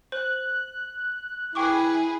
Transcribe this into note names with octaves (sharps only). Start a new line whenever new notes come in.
C5 F#6
E4 G#4 B4 G5 G#5 C#6 D6